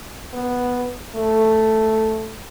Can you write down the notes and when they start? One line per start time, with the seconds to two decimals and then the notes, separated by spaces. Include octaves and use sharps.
0.33 B3
1.15 A3